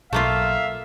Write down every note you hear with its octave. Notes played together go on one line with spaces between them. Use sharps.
B1 A3 A#3 F4 E5 F5